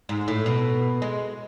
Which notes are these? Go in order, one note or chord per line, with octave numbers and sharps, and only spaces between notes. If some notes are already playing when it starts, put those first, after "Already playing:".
G#2
A2
B2
G#3